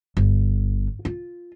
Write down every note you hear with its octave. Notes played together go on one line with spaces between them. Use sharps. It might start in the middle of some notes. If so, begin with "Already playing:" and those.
G1
F4